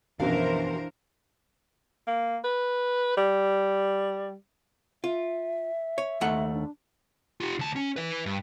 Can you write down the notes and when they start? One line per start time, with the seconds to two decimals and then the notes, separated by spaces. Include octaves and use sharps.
0.20 A#1 F#2 B2 E3 D4 A#4 C5 F5
2.07 A#3
2.44 B4
3.17 G3
5.04 F4 E5
5.98 C#5
6.21 D#2 A3 F#5
6.53 D4
7.40 F4 G4
7.59 D2 A5
7.76 C#4
7.96 B4 E5
8.26 G2